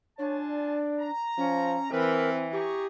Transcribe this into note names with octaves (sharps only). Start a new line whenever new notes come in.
D4 F4 C#5 G#5 A5
D5
A#5
F3 C#4
E3 C4 A#4 B4
G4 G#4 A#5 C#6